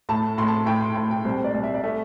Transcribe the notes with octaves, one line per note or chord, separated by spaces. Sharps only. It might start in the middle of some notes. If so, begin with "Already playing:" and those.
A2 A5
A2 C6
A5
A2 G5
C6
A2 A5
G5
C2 C5
D5
C2
E5
D5
A3 E5